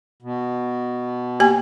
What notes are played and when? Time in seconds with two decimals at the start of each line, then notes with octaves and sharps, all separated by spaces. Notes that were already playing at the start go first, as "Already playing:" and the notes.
0.22 B2
1.40 A#3 G4 G#5